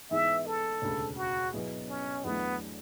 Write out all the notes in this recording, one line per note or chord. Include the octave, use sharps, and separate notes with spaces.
G#2 E3 B3 E4 G#4 E5
A4
E1 D2 C#3
F#4
B2 F#3 B3 E4 G#4
C#4
E2 D3 F#3 A3 B3 E4